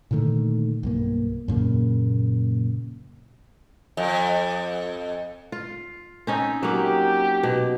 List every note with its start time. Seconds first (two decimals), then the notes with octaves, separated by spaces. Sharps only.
0.11 A#2 D3 D#3 A3
0.83 B1 G2 A#3
1.48 F#2 A#2 C#3 A#3
3.97 F2
5.52 F4
6.27 C4 C#4 D#4
6.63 F#3 A#3 G4
7.43 B2